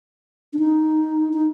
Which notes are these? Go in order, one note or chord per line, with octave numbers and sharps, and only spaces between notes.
D4
D#4
D#4